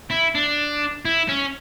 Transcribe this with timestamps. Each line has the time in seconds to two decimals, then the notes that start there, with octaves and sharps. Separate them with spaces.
0.11 E4
0.35 D4
1.05 E4
1.29 C#4